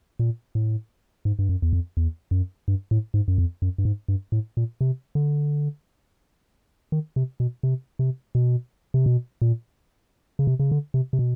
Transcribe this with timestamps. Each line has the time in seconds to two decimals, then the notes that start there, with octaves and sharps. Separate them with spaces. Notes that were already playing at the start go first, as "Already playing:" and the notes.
0.19 A#2
0.55 A2
1.25 G#2
1.39 G2
1.49 F#2
1.62 E2
1.73 F2
1.97 E2
2.31 F#2
2.68 G2
2.91 A2
3.14 G#2
3.28 F#2
3.38 F2
3.62 F#2
3.78 G2
3.85 G#2
4.08 G2
4.32 A2
4.57 A#2
4.81 C3
5.15 D3
6.92 D#3
7.16 C3
7.40 B2
7.63 C3
7.99 C3
8.35 B2
8.94 C3
9.06 B2
9.42 A#2
10.39 C#3
10.47 C3
10.59 C#3
10.72 D3
10.94 C3
11.13 C3
11.19 B2